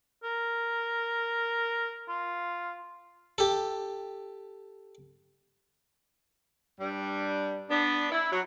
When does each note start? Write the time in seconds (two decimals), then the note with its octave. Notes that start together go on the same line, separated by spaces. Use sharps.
0.24 A#4
2.09 F4
3.38 G4 A4
6.80 G2 G3
7.70 B3 D4
8.11 E4
8.32 F#3